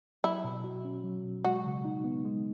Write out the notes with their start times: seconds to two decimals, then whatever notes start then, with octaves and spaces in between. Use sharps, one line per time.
0.24 F#3 E4
0.44 B2
0.64 F#4
0.85 C#4
1.04 F#3
1.24 B2
1.44 G#3 F#4
1.65 C#3
1.85 D#4
2.04 B3
2.25 G#3